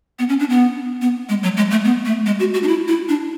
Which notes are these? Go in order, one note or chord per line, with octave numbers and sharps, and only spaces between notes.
B3
C#4
D4
B3
B3
G#3
F#3
G#3
A3
B3
A3
G#3
F#4
F#4
D4
E4
E4
D4